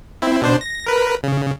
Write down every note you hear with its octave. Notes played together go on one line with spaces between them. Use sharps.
C4 E4
B2 D4 C5
A#6
A#4 B4
C#3